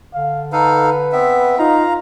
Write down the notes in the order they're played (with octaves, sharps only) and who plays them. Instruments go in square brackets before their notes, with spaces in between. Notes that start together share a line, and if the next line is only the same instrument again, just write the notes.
[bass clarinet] D3 [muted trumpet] F5
[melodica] D#4 A4 F5 [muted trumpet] B4
[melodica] B3 C4 E5
[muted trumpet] D#4 [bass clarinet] F4 [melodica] F5 A#5